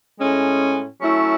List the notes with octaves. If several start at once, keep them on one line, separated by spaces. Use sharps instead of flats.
A2 G#3 C#4
F#3 A3 C#4 E4